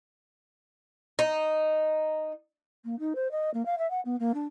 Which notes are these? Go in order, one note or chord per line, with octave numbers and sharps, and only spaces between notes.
D#4
A#3
D#4
C5
D#5
A#3
F5
E5
F#5
B3
A#3
D4